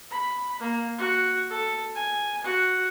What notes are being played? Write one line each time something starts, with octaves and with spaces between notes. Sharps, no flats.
B5
A#3
F#4
A4
G#5
F#4